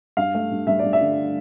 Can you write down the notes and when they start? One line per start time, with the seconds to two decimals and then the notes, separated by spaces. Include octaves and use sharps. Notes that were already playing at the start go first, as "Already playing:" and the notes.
0.17 G2 F5
0.35 A3
0.51 G2
0.67 G2 E5
0.79 D5
0.84 G2
0.93 E5
1.01 D3